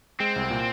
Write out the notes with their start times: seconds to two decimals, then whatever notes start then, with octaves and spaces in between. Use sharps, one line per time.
0.20 G#3 C4
0.36 C2
0.50 A#2